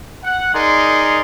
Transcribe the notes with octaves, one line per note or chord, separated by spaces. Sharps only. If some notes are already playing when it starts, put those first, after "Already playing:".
F#5
D#4 G#4 A#4 D5 C6